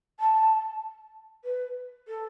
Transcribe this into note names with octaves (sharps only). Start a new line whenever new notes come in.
A5
B4
A4